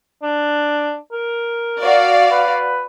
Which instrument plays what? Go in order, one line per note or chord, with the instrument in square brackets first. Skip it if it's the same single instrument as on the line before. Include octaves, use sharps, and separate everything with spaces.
[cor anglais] D4
A#4
[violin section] F#4 D5 F5
[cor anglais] B4